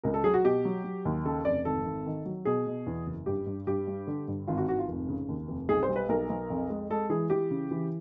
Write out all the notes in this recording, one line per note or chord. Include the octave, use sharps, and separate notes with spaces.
C#2 A#4
A4
F#3 G#4
F#4
B2 G4
F#3
F#3
D#2
C#3 A4
F1 D5
G#1 A4
G#1
D#3
F#3
B2 G#4
B2
E2
F#1
G2 G4
G2
G2 G4
G3
D3
G2
G#1 F4
F#4
G#1 F#4
F4
F1
C#3
D#2
F1
B1 G#4
C5
G3
B4
B1 A#4
B1
F2
G#3
G#3 A4
E3 G#4
E3 G4
C#3
E3